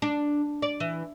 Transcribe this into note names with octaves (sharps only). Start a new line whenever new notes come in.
D4
D5
E3